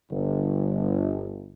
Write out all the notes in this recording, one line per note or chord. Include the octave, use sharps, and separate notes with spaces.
G1